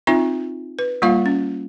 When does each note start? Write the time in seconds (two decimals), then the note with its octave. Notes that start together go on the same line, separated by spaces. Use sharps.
0.07 C4 D#4 F4 E5
0.79 B4
1.02 G3 A#3 F4 F5
1.26 C#4